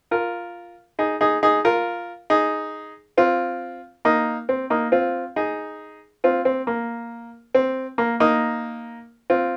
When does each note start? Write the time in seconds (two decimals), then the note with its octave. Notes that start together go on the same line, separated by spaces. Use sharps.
0.11 F4 A#4
0.99 D#4 G#4
1.21 D#4 G#4
1.43 D#4 G#4
1.65 F4 A#4
2.30 D#4 G#4
3.17 C4 F4
4.05 A#3 D#4
4.49 C4
4.70 A#3 D#4
4.92 C4 F4
5.36 D#4 G#4
6.24 C4 F4
6.45 C4
6.67 A#3
7.55 C4
7.98 A#3
8.20 A#3 D#4
9.30 C4 F4